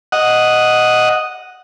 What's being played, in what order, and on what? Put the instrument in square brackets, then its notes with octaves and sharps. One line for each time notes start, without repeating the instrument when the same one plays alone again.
[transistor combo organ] D#5 F#5